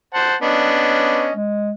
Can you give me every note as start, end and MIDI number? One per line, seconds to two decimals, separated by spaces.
0.14 0.35 72
0.14 0.35 78
0.14 0.35 81
0.42 1.32 59
0.42 1.32 61
0.42 1.32 62
0.42 1.32 75
1.35 1.72 56